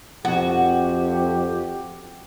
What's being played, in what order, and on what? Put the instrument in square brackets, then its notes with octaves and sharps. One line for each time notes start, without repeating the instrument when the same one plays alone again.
[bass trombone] F2 [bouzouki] F#4 [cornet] G4